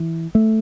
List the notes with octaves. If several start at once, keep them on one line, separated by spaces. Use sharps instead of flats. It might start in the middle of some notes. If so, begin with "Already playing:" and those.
Already playing: E3
A3